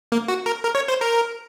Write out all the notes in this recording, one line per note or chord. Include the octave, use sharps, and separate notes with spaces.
A#3
F#4
A#4
A#4
C#5
C5
A#4